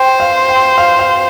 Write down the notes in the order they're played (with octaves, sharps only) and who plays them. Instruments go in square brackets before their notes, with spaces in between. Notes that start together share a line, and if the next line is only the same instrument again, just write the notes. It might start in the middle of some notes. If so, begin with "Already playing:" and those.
Already playing: [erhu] C5 [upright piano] G5
[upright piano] F5
G5
F5
F5